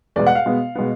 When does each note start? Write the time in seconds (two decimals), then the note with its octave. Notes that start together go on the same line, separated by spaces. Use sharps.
0.16 E2 B2 G#3 D5
0.27 F#5
0.35 F5
0.46 B2 G#3 B3
0.75 B2 G#3 B3